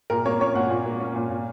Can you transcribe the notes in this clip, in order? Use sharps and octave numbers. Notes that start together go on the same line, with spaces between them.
A#2 A#4
A#3 C#5
C#4 C#5
A#2 F#5
A#2
A#3
C#4
A#2
A#2